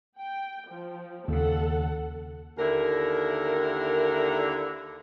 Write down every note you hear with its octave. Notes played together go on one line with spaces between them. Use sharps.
G5
F3
D#2 C#3 A4 F#5
D#2 D3 E4 A#4